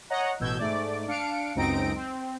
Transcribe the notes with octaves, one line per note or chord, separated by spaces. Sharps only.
C#5 D#5 F#5 A#5
A1 B2 E6 G6 G#6
G#2 A3 D5 D6
D4 F5 C#7 D7
C#2 F#2 C4 D#4 A#6 D7
C4